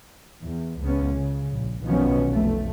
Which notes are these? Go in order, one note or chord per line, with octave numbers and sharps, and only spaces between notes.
E2
C#2 B3 C#4
C#3
A#1
B1 B2 D#3 F3 B3 C#4
F1 B1 A3